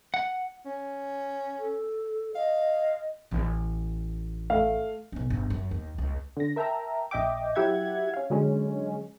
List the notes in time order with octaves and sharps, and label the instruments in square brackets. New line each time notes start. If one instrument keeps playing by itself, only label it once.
[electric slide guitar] F#5
[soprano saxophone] C#4
[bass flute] A4
[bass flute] D#5 [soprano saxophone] F5
[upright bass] A1
[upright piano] A3 F5
[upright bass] B1 C#4
G1
F#2
D#2
C#2
[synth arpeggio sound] D3 A#6
A#4 E5 G5 A5 A#5
A#1 D#5 E5 G5 D6
F#3 E4 G4 E5 F#5 G#6
C#4 F5
D3 F#3 G#3 C#4